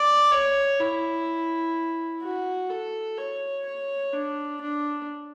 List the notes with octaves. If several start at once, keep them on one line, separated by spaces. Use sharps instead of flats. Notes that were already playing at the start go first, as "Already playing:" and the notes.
Already playing: D5
C#5
E4
F#4
A4
C#5
C#5
D4
D4